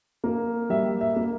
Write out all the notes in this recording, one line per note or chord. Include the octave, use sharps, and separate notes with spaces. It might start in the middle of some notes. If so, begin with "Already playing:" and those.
A#3
G3 E5
E5
A#3